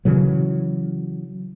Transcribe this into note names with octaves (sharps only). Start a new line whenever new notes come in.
C#3 E3 F#3